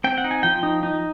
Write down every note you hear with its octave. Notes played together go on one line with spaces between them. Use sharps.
C4 G5
F#5
D#4
G#5
F3 G5
D#4
D#4